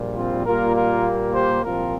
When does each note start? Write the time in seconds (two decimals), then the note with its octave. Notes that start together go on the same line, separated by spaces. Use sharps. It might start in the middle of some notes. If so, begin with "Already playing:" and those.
Already playing: A#1 A#2 G3
0.16 C4 F4
0.45 A#2 G3 A#3 F4 A#4
0.75 F4 A#4
1.34 G4 C5
1.64 C2 A#2 F3 C4 F4 A#4